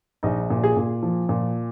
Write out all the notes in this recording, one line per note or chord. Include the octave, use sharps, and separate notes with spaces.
A#1 D#4
A#2
G#4
A#2
F3
A#2